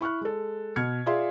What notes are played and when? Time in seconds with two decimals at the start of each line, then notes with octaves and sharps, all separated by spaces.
0.01 E4 C#6 F6 F#6
0.21 G#3 A4
0.76 B2 F6 G#6 C#7
1.06 F4 G#4 D5 E5 F5 C6